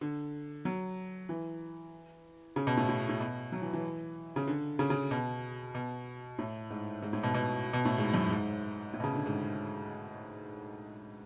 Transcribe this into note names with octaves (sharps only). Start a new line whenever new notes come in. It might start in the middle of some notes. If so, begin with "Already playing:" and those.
D3
F#3
E3
C#3
B2
A2
A2
A2
B2
F#3
E3
E3
C#3
D3
C#3
C#3
B2
B2
A2
G#2
G#2
A2
B2
B2
B2
A2
G#2
F#2
G#2
A2
B2
C#3
D3
G#2